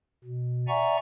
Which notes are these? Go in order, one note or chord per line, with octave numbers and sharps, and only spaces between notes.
B2
D5 E5 F#5 G#5 A#5 C#6